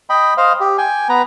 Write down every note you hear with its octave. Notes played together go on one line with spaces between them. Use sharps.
D#5 G5 B5
C5 D#5 F5
G4
G5 G#5
B3 B4 A#5